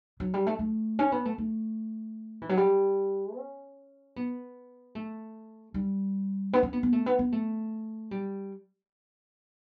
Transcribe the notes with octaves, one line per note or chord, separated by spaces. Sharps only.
F#3
G3
A3
A3
C#4
B3
A3
A3
E3
F#3
G3
C#4
B3
A3
G3
B3
C#4
B3
B3
A3
B3
B3
A3
G3